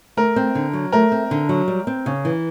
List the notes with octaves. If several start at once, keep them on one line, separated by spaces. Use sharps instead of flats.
A3 A#4
C4
D3
F#3
A3 A#4
C4
D3
F#3
G3
C4
C#3
E3